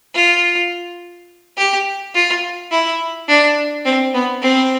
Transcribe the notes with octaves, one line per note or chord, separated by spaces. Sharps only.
F4
G4
F4
E4
D4
C4
B3
C4